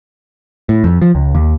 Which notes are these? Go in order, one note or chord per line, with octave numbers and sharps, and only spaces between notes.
A2
F2
F3
C#2
D#2